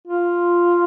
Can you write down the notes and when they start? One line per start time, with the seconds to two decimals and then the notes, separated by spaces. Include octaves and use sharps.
0.07 F4